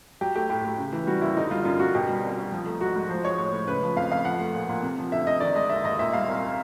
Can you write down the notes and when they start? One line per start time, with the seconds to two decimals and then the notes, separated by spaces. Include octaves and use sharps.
0.21 F#3 G4
0.35 A3 G4
0.50 A2 G4
0.65 A2
0.78 C#3
0.92 E3
1.07 G3 F#4
1.21 D#2 E4
1.37 D3 D#4
1.51 G3 F4
1.65 F#2 F4
1.80 F#2 F#4
1.95 B2 G4
2.09 G3
2.24 C2
2.38 C2
2.52 F3
2.66 A3
2.80 G#2 F#4
2.96 G#2
3.09 F3 C5
3.24 G#3 C#5
3.38 A2 C#5
3.53 A2
3.67 C#3 B4
3.83 F3
3.96 F2 F5
4.11 F2 F5
4.25 F3 F#5
4.40 A3
4.54 A#2
4.69 A#2
4.83 C3
4.98 F3
5.12 D2 E5
5.26 D2 D#5
5.40 D#3 D5
5.55 G#3 D#5
5.70 D#2 E5
5.84 D#2 D#5
5.99 A#2 E5
6.13 G3 F5
6.28 C2